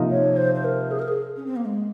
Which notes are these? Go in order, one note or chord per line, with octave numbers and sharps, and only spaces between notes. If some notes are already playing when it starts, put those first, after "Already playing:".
Already playing: C3 F3 A#3 D#4
C#5
C5
C5
A#4
G#4
A#4
G#4
C#4
C4
A#3
G#3